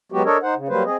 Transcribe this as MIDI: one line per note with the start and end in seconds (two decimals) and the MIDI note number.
0.12 0.22 54
0.12 0.22 56
0.12 0.22 59
0.12 0.22 66
0.12 0.22 67
0.25 0.37 62
0.25 0.37 69
0.25 0.37 70
0.25 0.37 73
0.25 0.37 75
0.43 0.54 63
0.43 0.54 72
0.43 0.54 78
0.56 0.68 49
0.69 0.83 54
0.69 0.83 55
0.69 0.83 58
0.69 0.83 71
0.69 0.83 72
0.85 0.97 60
0.85 0.97 68
0.85 0.97 75